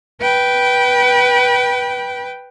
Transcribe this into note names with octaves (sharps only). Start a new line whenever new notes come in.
B4 G5